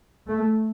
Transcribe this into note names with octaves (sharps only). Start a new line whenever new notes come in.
A3